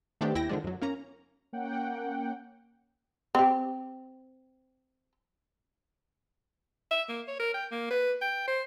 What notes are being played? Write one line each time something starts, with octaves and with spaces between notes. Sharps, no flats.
D#3 A3 B3 C4 D4 G4
D#2 E4 G5 A#6
D3 D#3 F3 G#3 D4
F#2 F#3
A#3 C#4 A#5
A#3 C#4 F#5 G5
C4 G4
E5
A#3
C#5
A#4
G5
A#3
B4
G5
C5